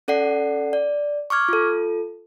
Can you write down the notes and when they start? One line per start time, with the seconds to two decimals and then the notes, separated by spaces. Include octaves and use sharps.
0.08 C#4 A4 D5 F#5 C7
0.73 D5
1.30 C#6 D6 F6 G#6
1.49 F4 A4